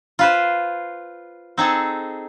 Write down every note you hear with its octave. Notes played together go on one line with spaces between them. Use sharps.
F4 B4 C5
C4 D#4 G#4 A4